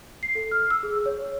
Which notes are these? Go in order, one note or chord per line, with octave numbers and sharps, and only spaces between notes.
C7
A4
F6
E6
G#4
C#5
C#5